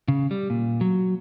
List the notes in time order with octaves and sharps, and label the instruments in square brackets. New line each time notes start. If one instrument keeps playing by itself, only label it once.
[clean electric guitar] C#3
G3
A#2
F#3